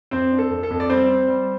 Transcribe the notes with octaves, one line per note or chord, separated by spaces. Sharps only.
F2 C4 C5
D4
A4
F2
A4
F2
D5
G3 C4 C5
C4
G3